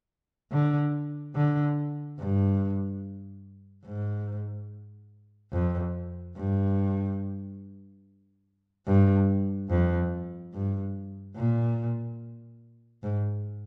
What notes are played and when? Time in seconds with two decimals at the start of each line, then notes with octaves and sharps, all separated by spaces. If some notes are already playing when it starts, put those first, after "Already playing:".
0.52 D3
1.35 D3
2.19 G2
3.86 G#2
5.53 F2
6.36 G2
8.87 G2
9.70 F2
10.54 G2
11.36 A#2
13.03 G#2